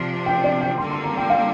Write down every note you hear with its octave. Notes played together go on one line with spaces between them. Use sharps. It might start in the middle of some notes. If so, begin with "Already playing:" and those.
Already playing: C3 F3 D4 C6
G5
D5
G5
D3 G3 A#3 C6
C6
A#5
G5
F5